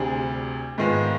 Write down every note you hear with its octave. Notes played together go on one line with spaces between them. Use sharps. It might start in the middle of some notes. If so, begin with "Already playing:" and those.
Already playing: D2 C3 G3 D4 G#4
G#2 D#3 G#3 B3 F4